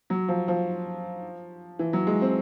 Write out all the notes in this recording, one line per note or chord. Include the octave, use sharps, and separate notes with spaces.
F#3
F3
F3
E3
F#3
G#3
C4